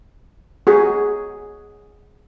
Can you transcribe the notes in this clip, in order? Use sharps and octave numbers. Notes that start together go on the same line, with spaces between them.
F#4 G#4